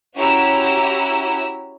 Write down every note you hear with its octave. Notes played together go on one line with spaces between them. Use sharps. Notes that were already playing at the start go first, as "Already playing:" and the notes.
C#4 E4 F#4 G4 A#5 E6